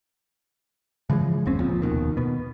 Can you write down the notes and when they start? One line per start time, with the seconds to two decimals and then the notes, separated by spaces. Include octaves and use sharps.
1.10 C#3 E3 F3 G#3
1.46 F#1 D#2 C4 C#4
1.60 C#2 A#2 F3
1.82 F1 D#2 B2 D#3
2.17 B2 B3